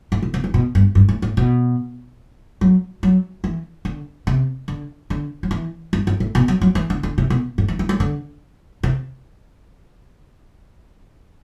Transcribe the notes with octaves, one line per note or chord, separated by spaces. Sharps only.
A2
B2
C3
E3
B2
G2
G2
A2
A2
B2
F#3
F#3
E3
D3
C3
D3
D3
F#3
E3
G2
F#2
A2
B2
F#3
F#3
E3
D3
D3
C3
B2
A2
E3
E3
F#3
D3
C3